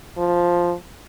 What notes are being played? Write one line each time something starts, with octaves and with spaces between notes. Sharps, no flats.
F3